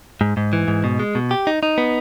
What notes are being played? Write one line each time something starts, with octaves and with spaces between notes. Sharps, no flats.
G#2
G#2
E3
G#2
B2
G#3
B2
G4
D#4
D#4
B3